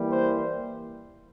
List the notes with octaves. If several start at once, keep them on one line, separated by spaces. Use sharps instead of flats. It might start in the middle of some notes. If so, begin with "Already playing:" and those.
Already playing: E3 G3 A#3
C5